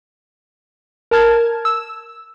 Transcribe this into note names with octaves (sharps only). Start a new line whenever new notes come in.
A#4 A5 F6 G#6
E6